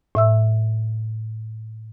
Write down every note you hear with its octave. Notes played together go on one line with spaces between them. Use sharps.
A2 E5 E6